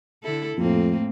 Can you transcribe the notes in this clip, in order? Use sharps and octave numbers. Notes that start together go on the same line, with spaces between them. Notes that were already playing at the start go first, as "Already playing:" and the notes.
D3 E4 A4
F2 A2 A#3 C4